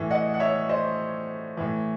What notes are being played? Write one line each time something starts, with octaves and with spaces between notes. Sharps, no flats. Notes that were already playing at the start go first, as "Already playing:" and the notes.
Already playing: A2 E3
D#5 F#5
F#5
C#5 E5
C5 D#5
A2 E3